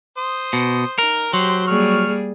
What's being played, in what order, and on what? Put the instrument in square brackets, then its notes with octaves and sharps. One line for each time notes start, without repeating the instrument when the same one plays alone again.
[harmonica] C5 D#6
[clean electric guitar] B2
[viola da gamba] D#4 [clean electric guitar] A#4
[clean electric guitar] F#3 [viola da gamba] G4 [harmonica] C5 C6
[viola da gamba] G3 A#3 G#4 [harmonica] C#6 F6